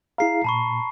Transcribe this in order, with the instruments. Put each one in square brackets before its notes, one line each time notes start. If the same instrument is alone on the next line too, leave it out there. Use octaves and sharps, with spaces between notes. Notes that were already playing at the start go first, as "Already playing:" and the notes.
[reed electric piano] E4 G#4 F5 [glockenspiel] A#5 C7
[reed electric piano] A#2 [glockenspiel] A5 B5 C#6